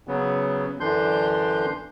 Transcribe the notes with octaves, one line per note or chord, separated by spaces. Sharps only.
C#3 F#3 B3
F#2 D3 E3 D4 C6 G6